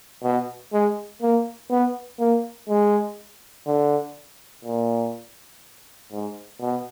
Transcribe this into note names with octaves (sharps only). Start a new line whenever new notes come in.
B2
G#3
A#3
B3
A#3
G#3
D3
A#2
G#2
B2